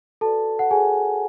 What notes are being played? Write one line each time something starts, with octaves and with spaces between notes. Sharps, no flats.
F#4 A4 B4 D5 A5
F#5
F#4 G#4 B4 D5 G#5